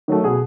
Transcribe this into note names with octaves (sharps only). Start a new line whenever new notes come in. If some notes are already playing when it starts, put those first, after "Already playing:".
D#3 F#3 A3
B2 G#4